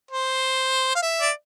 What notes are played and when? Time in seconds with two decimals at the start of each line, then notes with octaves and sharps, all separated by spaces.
0.11 C5
0.96 F5
1.02 E5
1.21 D5